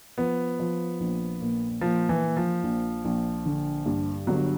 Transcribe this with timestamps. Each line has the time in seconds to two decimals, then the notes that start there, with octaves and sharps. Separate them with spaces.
0.18 F3 B3
0.60 F3
1.00 A#1
1.41 A#2
1.81 F3 A#3
2.09 E3
2.23 A#3
2.37 F3
2.63 A#1
3.05 A#1
3.46 D3
3.86 G2
4.27 G1 F#3